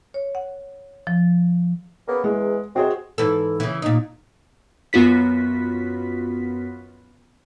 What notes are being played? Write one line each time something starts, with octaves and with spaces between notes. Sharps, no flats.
C#5
F#5
F3
C#3 A#3 B3
E2 G#3
C3 G#3 C4 F#4 G#4 C5
G#2 E3 A4
C#3 E3
A#2 D#4
F#2 B3 F4 F#4 B6